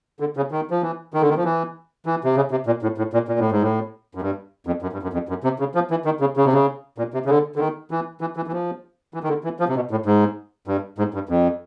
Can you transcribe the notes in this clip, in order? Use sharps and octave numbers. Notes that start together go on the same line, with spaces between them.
D3
C#3
D#3
F3
E3
D#3
D3
D#3
F3
E3
E3
C3
C#3
C3
A#2
A2
A2
A#2
A#2
A2
G#2
A2
F#2
G2
F2
F#2
G2
F#2
F2
F#2
C3
C#3
F3
E3
D#3
C#3
C#3
C3
C#3
A#2
C3
C#3
D3
D3
D#3
E3
E3
E3
E3
F3
E3
D#3
D3
E3
F3
C3
B2
A2
G#2
G2
G#2
G2
F2